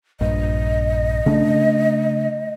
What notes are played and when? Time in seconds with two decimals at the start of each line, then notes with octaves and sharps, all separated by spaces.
0.21 A#1 G2 D#5
1.26 C#3 A3 D4